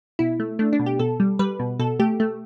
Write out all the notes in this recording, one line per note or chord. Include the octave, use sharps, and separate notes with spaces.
B2 E4
A3
A3 D4
D4
B2
G4
B2 A4
G3
G3 B4
B2
B2 A4
A3 G4
A3